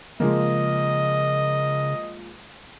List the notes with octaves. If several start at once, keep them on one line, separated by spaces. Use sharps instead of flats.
C#3 F3 G#3 A#3 D#5